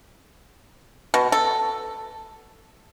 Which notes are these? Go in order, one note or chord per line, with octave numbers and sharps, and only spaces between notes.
B2
A4